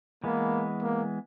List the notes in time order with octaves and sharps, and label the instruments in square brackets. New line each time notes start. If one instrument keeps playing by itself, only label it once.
[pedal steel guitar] E3 G#3 B3 [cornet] A#3
[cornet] A#3